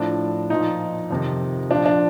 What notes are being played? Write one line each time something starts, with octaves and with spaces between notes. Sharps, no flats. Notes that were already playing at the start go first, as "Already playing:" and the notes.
Already playing: A2 F3 D4
A#2 F3 D#4
F2 C3 D#3
A#2 F3 D4
D4